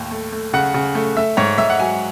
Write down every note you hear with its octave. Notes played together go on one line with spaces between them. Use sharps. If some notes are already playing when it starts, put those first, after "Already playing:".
Already playing: D#2 A2
A3
A3
C#3 F#5
C#3
A3
A3 E5
G#2 C#5
G#2 E5
F#5
F#3 G#5